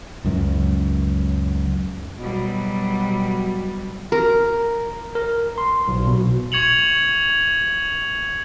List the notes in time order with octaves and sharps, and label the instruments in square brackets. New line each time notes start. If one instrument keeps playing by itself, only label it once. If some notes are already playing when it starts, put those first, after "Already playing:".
[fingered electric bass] C#2 F#2
[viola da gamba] B2 F#3 G3
[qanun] A#4
[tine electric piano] A#4
C6
B1
B2
[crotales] C#6 G#6 C#7 F7 F#7